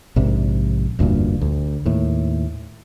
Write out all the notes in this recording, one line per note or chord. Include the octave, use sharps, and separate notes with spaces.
A#1 G#2 C3
F1 D2 G2 A#2
D2
D#2 A2